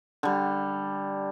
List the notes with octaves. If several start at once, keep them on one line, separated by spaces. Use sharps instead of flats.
D3 G3